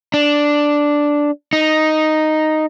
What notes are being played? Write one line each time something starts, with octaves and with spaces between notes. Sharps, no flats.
D4
D#4